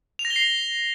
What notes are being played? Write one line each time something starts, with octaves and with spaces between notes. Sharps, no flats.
F7
A#6
G7
C7